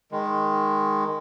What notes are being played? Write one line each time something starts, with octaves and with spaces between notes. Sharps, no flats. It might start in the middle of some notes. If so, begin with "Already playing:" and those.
D#3 G#3